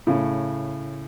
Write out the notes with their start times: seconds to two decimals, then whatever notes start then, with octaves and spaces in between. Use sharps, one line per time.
0.07 A2 C#3